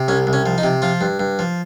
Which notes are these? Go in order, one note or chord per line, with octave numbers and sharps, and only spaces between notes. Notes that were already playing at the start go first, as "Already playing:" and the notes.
Already playing: C3
C2 C#4
C2
C#4
F3
D#4
C3
F3 F4
G2
G2
F3